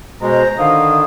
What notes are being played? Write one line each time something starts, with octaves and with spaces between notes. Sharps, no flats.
B2 G#3 C5 A#5
D3 D#3 F5 D#6